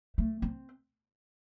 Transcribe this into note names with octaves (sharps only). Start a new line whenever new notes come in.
A3
C4